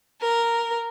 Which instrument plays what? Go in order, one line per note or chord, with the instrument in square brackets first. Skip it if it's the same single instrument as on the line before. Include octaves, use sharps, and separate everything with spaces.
[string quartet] A#4